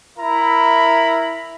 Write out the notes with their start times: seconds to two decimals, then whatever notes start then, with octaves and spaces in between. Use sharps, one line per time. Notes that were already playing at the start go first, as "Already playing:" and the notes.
0.19 E4 A#4 E5 A#5 B5